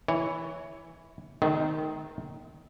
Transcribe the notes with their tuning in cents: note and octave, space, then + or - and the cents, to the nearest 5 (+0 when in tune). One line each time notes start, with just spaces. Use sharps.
E3 +0 C#5 +15
D#3 +0 A3 -35 C4 -35